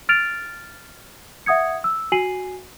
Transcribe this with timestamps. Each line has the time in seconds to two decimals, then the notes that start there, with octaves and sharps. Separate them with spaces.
0.09 F6 A6 D7 F7
1.46 E5 F#5 D#6 G#6 C#7
1.84 E6
2.12 F#4 G#5 C7 D#7 F#7